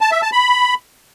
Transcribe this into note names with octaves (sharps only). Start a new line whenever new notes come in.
A5
E5
A5
B5